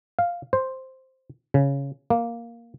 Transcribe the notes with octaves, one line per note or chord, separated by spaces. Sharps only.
F5
C5
C#3
A#3